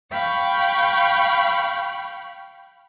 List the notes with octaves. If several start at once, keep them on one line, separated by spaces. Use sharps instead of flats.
F5 G5 B5 C#6